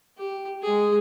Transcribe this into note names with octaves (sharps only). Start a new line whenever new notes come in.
G4
G#3 G#4